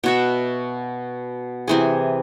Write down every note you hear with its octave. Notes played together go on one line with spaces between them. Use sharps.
B2 F#4 E5
C3 E3 G#4